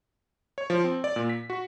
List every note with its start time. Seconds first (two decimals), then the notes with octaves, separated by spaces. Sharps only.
0.58 C#5
0.70 F3
0.84 C4
1.04 D5
1.16 A#2
1.29 B6
1.50 F#4